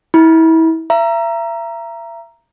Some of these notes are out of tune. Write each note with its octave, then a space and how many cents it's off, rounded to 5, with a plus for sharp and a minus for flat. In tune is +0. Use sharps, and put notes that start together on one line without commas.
E4 -30 B5 -35
E5 +35 A#5 +0